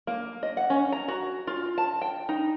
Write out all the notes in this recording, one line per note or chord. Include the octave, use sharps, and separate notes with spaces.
A#3
D#5
F#5
C#4
A#5
F#4
F4
A5
G5
D#4